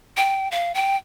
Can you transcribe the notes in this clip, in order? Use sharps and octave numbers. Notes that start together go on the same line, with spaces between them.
G5
F5
G5